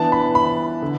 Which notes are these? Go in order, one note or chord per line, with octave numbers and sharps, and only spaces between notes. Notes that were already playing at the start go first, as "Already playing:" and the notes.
Already playing: E3 B3 D4 A5
B5
B5
D3